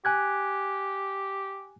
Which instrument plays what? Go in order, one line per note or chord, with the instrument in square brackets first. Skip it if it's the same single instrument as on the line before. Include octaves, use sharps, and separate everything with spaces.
[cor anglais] G4 [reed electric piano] G#5 F#6 G#6